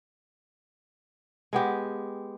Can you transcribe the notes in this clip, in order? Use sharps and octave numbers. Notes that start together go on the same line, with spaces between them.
G#3 B3 G4